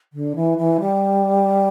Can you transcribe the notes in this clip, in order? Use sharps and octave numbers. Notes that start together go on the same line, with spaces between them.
D3
E3
E3
G3